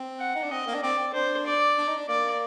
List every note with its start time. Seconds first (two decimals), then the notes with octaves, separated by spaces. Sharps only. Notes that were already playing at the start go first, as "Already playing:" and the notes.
Already playing: C4
0.19 F#5
0.35 D#4
0.43 D4
0.51 C4 D#5
0.67 A#3
0.74 D4
0.83 C4 D5
0.99 C4
1.14 D4 C5
1.46 D5
1.78 D4
1.88 D#4
1.98 D4
2.09 A#3 D5